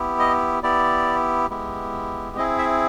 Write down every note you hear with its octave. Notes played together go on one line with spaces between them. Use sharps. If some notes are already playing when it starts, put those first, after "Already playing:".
Already playing: B3 E4 G4
D#5
B3 E4 G4 D5
G#3 B3 E4 G4
C4 E4 G#4 D#5
E5